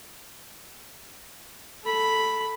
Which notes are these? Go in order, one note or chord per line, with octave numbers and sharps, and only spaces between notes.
A4 B5